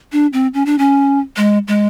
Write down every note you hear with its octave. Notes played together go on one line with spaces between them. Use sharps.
D4
C4
C#4
D4
C#4
G#3
G#3